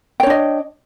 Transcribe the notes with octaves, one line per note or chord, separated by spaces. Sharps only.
D4 C#5 D#5 G5